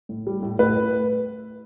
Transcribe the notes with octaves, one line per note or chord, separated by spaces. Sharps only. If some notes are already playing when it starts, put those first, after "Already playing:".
A2
G3
A2
A2 B4